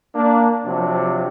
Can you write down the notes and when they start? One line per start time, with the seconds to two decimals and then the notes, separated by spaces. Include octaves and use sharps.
0.15 A#3 D4
0.65 C3 F3 F#3 D4